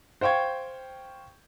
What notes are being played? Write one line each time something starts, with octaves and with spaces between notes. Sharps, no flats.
C5 F5 G5 C#6 G#6